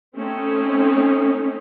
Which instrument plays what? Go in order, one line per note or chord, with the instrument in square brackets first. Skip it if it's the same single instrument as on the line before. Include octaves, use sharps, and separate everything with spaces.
[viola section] A3 C4 C#4 D#4